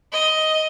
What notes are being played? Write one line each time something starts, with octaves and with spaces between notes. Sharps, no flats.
D#5